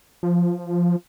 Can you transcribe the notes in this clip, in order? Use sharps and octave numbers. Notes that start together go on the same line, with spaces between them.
F3